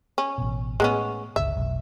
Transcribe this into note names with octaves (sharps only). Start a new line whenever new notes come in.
C#4
A1 B2
A2 G#3 B3 C#4
G1 C#2 E5
F1 B1